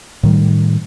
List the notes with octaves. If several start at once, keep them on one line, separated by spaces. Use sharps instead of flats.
A2 D#3 G3